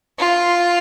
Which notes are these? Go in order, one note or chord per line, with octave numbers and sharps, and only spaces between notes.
F4